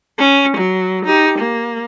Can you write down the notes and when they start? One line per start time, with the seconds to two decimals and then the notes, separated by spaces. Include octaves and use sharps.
0.18 C#4
0.57 F#3
1.05 D#4 G4
1.38 A#3